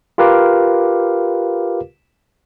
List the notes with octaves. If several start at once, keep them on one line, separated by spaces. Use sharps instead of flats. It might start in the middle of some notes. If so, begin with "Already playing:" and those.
F4 G4 A#4 B4 F5 D6